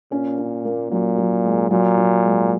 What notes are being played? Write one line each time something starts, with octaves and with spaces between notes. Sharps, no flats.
A#2 C#4
C#4
A#3
A#2 F#3
F#3
G#3
A#2 F#3
F#3
G#3